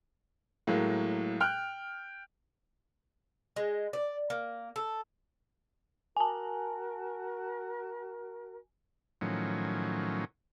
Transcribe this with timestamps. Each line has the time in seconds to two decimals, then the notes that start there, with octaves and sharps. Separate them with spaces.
0.67 A2 F#3 G#3 A#3
1.40 G5 F6 F#6
3.56 G#3
3.93 D5
4.30 A#3
4.76 A4
6.17 F#4 A#4 G#5 A5
9.21 A2 D#3 F3 F#3 C#4